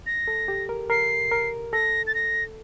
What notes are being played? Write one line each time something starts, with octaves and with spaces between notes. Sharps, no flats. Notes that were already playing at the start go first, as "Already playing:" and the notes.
A#6
A4
G4
A#4
A#4 C7
A#4
A4 A#6
A6
A#6